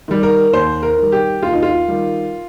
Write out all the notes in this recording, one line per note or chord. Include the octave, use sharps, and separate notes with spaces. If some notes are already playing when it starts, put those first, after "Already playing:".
D#3 G3
A#4
D#2 C5
A#4
D#3 G3
G4
D#2 F4
D#4
F4
D#3 G3